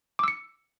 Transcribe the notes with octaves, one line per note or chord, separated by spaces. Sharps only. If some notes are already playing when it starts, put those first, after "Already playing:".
D6 E6 C#7